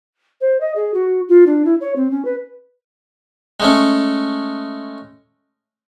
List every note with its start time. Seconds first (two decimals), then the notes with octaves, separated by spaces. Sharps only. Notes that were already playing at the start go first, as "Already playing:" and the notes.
0.41 C5
0.61 D#5
0.76 G#4
0.94 F#4
1.28 F4
1.47 D4
1.65 E4
1.81 C#5
1.96 C4
2.11 C#4
2.25 B4
3.60 G#3 A3 C#4